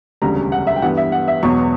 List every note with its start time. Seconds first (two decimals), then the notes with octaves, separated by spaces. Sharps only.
0.22 E1 D2 C#3 G3 A#5
0.52 F#5
0.67 E5
0.76 G5
0.82 G2 E3 G3 B3 F#5
0.97 E5
1.12 F#5
1.28 E5
1.43 E1 E2 B2 F#3 B3 C#6